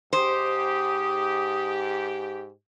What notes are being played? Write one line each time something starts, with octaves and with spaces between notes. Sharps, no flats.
G#2 G4 C5 D#6